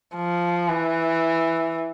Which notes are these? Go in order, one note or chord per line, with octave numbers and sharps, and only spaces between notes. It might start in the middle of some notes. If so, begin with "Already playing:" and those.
F3
E3